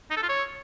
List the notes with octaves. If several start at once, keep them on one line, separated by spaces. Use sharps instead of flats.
D#4
A4
F4
C#5